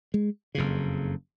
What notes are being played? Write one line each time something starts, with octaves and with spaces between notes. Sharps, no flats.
G#3
F#1 F2 C#3